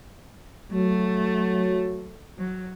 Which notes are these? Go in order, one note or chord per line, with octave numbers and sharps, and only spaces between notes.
F#3 A3
F#3